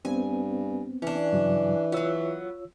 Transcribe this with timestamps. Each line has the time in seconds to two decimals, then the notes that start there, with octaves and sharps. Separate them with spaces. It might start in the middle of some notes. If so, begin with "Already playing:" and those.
0.05 G2 B3 C4 G#5
1.02 E3 C#4 D4
1.33 G2 C#3 F#3
1.92 F#3 B3 F4 C#5 E6